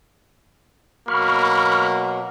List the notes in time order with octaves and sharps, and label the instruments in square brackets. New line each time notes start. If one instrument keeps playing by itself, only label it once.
[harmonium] B2 F#3 F#4 [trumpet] A#3 [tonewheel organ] B5 C#6 F6